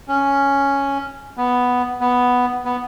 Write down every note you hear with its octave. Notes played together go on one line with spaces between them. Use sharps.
C#4
B3
B3
B3